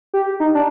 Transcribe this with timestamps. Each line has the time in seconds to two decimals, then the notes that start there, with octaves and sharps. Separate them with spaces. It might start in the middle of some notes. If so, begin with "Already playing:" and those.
0.14 G4
0.40 D#4
0.55 D4